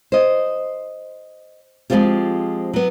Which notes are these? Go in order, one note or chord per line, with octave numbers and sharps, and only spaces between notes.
C5 D#5
F3 G#3 A#3 C4 F4 G4
F#3 B3